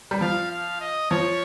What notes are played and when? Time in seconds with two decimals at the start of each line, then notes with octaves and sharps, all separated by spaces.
0.11 G3
0.21 F3 F5
0.51 F5
0.81 D#5
1.11 F3 C#5